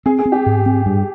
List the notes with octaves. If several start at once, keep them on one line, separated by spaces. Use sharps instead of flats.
C4 G#4
G#4
C4
G4
G#2
C4
G2